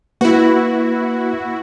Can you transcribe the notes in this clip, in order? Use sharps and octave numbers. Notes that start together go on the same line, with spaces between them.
A#3 E4 F#4 B4